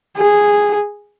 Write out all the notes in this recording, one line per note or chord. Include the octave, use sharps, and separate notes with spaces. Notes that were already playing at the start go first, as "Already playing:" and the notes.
G#4